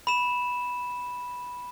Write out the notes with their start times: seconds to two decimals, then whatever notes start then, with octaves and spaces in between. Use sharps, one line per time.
0.07 B5 E7